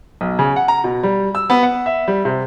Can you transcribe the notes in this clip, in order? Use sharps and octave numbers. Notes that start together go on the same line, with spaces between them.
B1
C#3
F#5
A#5
B2
G3
E6
B3
F#5
E5
G3
C3